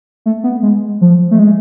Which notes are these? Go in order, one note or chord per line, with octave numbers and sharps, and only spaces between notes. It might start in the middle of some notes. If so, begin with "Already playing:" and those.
A3
B3
G#3
F3
A3
G#3